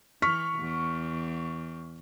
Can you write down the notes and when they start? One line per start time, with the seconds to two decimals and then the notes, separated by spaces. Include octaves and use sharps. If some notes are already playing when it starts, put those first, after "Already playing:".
0.22 E3 C#6 F6 B6
0.59 E2